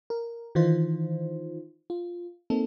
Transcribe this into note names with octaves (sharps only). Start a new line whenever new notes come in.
A#4
D#3 E3 D#4 F4 C5
F4
A#3 C4 D#4 A4